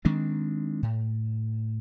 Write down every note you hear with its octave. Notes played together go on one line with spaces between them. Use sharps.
D#3 G#3 C4 D4
A2